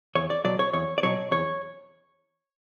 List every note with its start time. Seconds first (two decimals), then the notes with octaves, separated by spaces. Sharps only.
0.15 E2 C#5
0.30 D5
0.44 B2 F#3 D5
0.59 C#5
0.73 E2 C#5
0.98 D5
1.03 B2 F#3 C#5
1.31 E2 C#5